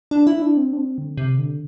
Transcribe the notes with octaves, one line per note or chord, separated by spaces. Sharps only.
D4
E4
D4
C4
D4
C4
D3
C3
D3